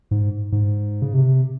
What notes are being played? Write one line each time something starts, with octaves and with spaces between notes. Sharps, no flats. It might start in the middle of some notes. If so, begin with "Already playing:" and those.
G#2
G#2
C#3
C3